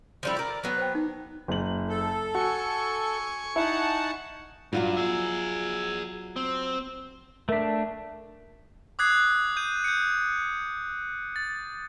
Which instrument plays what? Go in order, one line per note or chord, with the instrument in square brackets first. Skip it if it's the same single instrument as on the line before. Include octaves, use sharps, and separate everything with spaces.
[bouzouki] F3 G3 E4
A#4 D5
[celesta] A6
[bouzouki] F#3 B3
[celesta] C5 G5
D#4
[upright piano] F#1 F#7
[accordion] A4
[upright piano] F#4 [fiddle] G#5 C#6
[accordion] D#4 F#5 A5 [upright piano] E4
[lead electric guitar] G2 [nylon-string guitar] F#3 F4 F#4
[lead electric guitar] G#4 E5
C4
[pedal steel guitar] A3 D4 [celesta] A#4 E5 B6
[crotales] D6 D#6 F#6 G#6 C7
G6 D#7
G6 C#7
A6